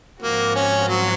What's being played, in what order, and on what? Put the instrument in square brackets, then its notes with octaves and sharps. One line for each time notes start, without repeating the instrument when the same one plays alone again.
[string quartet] G#2 F3 C4 F#4 [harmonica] A#3
[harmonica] C#4
F#3